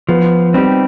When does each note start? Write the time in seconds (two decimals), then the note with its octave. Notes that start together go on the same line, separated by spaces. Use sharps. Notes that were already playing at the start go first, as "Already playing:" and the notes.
0.09 F3 B3
0.54 G3 C4 D#4 G4